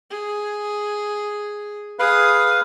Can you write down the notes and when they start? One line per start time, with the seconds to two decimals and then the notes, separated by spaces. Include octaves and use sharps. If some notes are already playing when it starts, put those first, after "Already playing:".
0.10 G#4
1.99 G#4 B4 F5 D#6